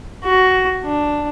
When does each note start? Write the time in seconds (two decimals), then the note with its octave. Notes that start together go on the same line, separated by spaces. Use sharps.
0.24 F#4
0.85 D4